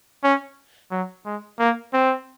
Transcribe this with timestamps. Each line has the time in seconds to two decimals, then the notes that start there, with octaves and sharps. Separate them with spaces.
0.24 C#4
0.91 F#3
1.26 G#3
1.59 A#3
1.94 C4